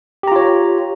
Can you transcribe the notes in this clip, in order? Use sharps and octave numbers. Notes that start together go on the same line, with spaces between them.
F4 G4 C#5 A#5